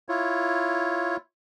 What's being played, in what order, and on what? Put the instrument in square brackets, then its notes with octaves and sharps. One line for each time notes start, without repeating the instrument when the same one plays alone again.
[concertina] E4 F4 C#5